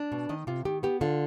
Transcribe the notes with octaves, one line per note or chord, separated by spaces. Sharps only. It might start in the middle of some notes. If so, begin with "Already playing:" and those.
Already playing: D4
B2
D#3 D#5
C3 F4
D#3 G4
B3 G4
D3 F4